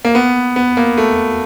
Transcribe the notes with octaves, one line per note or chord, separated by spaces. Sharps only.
A#3
B3
B3
A#3
A3